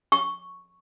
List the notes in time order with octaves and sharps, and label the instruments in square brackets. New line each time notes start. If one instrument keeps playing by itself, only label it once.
[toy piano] C#6